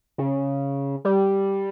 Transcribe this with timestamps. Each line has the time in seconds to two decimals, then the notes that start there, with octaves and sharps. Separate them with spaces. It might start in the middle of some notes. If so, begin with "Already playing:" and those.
0.18 C#3
1.05 G3